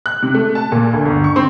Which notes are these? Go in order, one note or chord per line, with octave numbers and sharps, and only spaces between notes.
F#6
C3
A3
A5
A#2
D2
G1
C#6
C4